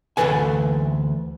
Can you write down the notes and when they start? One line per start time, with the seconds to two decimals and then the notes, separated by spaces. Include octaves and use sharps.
0.17 D2 G2 E3 A4 B4 G#5